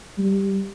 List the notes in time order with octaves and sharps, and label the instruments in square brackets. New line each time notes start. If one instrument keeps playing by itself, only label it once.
[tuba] G3